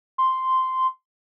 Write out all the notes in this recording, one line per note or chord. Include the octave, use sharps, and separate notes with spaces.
C6